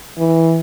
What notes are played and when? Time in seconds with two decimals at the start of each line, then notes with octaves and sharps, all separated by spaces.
0.18 E3